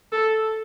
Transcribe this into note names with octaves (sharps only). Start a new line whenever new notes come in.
A4